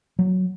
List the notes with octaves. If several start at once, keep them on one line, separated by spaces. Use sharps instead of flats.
F#3